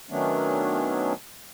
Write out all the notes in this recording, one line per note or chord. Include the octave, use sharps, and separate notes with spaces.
D#3 F#3 A3 B3 C#4 D4